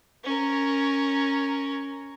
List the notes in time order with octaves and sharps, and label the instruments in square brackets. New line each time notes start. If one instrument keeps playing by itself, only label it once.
[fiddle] C#4 A#4